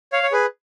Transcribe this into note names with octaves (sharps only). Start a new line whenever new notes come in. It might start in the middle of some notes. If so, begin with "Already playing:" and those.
C#5 F5
C#5
G#4 B4